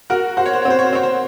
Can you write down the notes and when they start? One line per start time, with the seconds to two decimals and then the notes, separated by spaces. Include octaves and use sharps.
0.10 F#4 A#4
0.37 F#4 C5
0.46 C#5
0.53 C5
0.62 C4 C#5
0.70 C5
0.79 C#5
0.86 C5
0.93 C4 C#5
1.03 C5